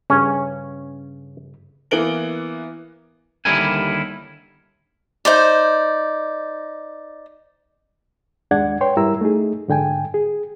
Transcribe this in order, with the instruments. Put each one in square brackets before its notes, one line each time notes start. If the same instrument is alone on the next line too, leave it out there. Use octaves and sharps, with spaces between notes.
[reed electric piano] G2 C#3 [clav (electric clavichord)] C#4
[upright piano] E3 A#3 B3 D7 F#7 G7
[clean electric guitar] D#2 D3 G3 E4 A#4 G#5
[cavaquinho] D#4 C5 D5
[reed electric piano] D#2 G#3 D4 D5 F#5 G#6
B4 C#5 G5 C6
G2 G3 E4 A#4 A#5 E6
A3 D#4 G#4
G#2 D3 G5 G#5
G#4